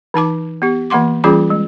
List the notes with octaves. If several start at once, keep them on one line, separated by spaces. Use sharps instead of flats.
E3 D#4 A5 D6
B3 G4
E3 A#3 F#5 C6 D6
E3 G3 C#4 F4 G#4 D6
G#3